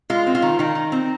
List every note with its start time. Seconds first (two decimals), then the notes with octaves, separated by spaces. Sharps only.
0.10 G#3 F4
0.27 C4
0.35 F4
0.42 D#3
0.59 D#3 D#4
0.75 D#3
0.92 C4